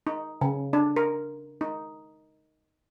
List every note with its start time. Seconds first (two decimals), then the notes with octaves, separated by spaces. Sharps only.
0.07 D#4
0.41 C#3
0.73 D4
0.96 A#4
1.61 D#4